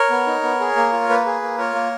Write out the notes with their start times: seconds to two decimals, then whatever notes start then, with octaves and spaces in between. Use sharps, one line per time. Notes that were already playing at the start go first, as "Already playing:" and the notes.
Already playing: A#4 C#5
0.10 B3
0.27 D#4
0.43 B3
0.60 G#4
0.76 A#3
0.93 F4
1.09 A#3 B4
1.26 G#4
1.42 A#3
1.58 F4 A#4 C#5
1.75 A#3